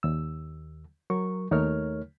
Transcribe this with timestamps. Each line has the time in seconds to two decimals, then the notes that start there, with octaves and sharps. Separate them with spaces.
0.03 D#2 E6
1.10 F#3 A#4 C#6
1.51 D#2 A3 D#4 A#4 C#5 F6